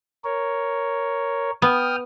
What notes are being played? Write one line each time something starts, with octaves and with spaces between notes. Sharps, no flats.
A#4 C#5
B3 G5 D#6 F6